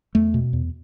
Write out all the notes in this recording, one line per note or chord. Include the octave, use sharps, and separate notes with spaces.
E2 A3
B2
E2